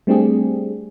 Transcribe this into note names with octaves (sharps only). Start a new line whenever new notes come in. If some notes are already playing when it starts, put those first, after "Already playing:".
G3 A3 C4 D4 G4 G#4